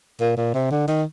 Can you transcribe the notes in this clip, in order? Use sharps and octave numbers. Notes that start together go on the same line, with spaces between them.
A#2
A#2
C3
D3
D#3